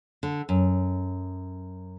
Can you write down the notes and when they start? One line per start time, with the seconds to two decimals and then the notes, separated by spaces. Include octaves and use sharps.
0.23 D3
0.49 F#2